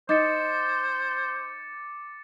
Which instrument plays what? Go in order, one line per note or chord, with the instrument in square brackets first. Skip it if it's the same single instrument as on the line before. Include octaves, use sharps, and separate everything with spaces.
[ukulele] D#4 [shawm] C5 [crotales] D6 A6 C#7